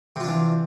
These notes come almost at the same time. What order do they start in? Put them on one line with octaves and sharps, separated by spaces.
C3 F4 D4 E3